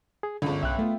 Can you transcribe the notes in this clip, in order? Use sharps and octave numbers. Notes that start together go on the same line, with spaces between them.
G#4
G1 C#2 D3
B1 E5 G5 F#6
A3 B3 F4